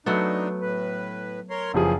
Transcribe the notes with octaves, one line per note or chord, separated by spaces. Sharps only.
F#3 A3 B3 D4 D#4
A2 B4
A#4 C#5 C6
F#1 E3 F3 G#4